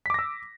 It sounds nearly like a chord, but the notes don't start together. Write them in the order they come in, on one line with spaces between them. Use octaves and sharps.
B6 D6 A#6 E6